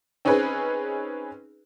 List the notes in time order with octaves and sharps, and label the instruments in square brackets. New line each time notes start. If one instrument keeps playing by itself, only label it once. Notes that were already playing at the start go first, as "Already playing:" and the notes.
[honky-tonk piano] C4 C#4 D#4 G#4 B4